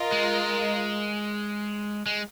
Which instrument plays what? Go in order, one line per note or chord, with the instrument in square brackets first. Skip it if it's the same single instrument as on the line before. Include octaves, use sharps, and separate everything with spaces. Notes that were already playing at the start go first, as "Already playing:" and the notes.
Already playing: [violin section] F4 A#4 D#5
[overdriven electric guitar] G#3
G#3